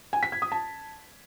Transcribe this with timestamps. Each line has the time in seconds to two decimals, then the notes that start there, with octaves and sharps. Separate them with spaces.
0.13 G#5
0.23 B6
0.32 G#6
0.42 D#6
0.52 A5